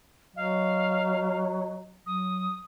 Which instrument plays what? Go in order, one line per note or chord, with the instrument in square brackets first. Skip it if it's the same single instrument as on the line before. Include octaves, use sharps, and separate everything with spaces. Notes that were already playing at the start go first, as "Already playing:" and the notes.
[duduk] F#3 [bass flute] D#5 [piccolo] F5
[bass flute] F#3 [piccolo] D#6